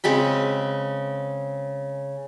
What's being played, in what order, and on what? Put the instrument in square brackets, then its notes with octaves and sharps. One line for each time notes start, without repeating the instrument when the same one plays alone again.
[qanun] C#3 G#3 C4 B5